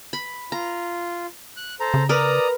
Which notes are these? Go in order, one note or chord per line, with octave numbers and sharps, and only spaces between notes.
B5
F4 A#5
F#6
A4 C5 A#5
C#3
A#4 B4 D5 A#5 D#6